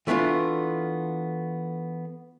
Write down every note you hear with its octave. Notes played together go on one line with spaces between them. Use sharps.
E3 A3 B3 D4 F4